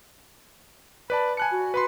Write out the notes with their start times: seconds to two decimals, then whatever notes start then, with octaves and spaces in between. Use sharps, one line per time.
1.10 B4 D5 A5 B5
1.37 G#5 A5 F#6 C#7
1.52 F#4
1.74 B4 B5 C6